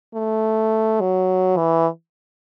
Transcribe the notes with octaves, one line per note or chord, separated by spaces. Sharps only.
A3
F#3
E3